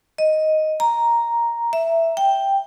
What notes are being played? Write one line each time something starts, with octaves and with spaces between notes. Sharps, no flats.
D#5
A#5
E5
G5